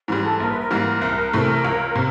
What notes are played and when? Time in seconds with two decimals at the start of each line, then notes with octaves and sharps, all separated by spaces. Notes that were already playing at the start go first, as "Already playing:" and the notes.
0.08 G#2 E3 G3 G#4
0.23 A4
0.39 A#1 A#4
0.50 B4
0.59 A#4
0.70 G#2 E3 G3 A#3 A#4
1.02 C2
1.33 C3 E3 A3
1.64 C#2
1.95 C3